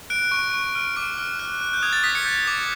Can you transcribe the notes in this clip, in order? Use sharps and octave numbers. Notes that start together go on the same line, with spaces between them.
F#6 D7
C#6
C#6
F6
D6 D7
F6
F#6
F#6
G6
D#6 G#6
A6
D#6 B6
C#7
G6
D6